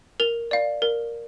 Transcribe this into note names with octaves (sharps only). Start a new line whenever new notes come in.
A#4 F7
D5 F5
A#4